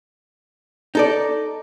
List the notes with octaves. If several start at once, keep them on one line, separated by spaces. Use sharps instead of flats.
D#4 A4 D5